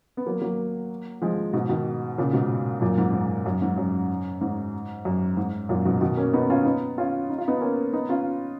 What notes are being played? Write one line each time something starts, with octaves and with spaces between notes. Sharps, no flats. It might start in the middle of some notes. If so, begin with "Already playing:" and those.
B3
F#3 A#3
F#3 A#3
F3 G#3
G#2 B2
B2 D#3
A#2 C#3
G#2 B2
F#2 A#2
G#2
G#2
F#2
G#2
F#2
G#2
F#2
G#2
F#2 A#2
G#2 B2
B2 D#3
A#3 C#4
B3 D#4
C#4 F4
B3 D#4
C#4 F4
D#4
F4
B3 D#4
A#3 C#4
B3 D#4
C#4 F4